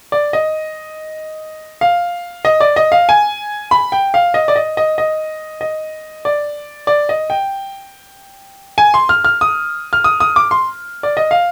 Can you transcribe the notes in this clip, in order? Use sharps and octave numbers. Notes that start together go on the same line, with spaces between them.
D5
D#5
F5
D#5
D5
D#5
F5
G#5
B5
G5
F5
D#5
D5
D#5
D#5
D#5
D#5
D5
D5
D#5
G5
G#5
C6
F6
F6
D#6
F6
D#6
D#6
D6
C6
D5
D#5
F5